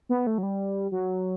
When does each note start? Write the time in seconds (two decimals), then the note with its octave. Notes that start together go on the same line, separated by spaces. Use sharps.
0.09 B3
0.27 A3
0.38 F#3
0.43 G3
0.92 F#3